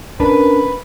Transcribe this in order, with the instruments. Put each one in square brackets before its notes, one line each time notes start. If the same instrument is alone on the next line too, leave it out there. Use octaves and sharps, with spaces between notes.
[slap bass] C#4 D4 [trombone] A#4 [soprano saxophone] B4